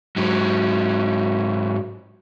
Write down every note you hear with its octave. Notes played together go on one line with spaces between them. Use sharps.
G#2 F#3